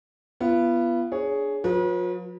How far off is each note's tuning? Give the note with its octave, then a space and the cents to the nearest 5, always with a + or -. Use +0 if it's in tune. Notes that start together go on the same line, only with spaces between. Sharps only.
B3 -5 F4 -40
D4 +0 G#4 +5 C#5 +5
F3 +45 B4 -40